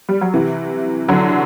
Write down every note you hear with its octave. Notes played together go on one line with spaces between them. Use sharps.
G3
F#3
C3 E3
D3 F#3